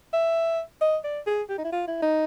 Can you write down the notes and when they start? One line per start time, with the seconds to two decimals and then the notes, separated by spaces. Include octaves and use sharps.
0.13 E5
0.81 D#5
1.04 D5
1.27 G#4
1.50 G4
1.58 D#4
1.65 E4
1.72 F4
1.87 E4
2.02 D#4